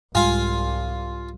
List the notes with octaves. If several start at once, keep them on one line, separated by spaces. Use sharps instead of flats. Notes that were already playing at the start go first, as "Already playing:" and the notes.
C2 G#2 G3 G#3 F4 G#5